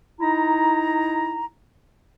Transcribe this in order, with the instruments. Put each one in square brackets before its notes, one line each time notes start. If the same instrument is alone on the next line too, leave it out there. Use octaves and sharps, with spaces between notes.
[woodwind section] D#4 E4 A#5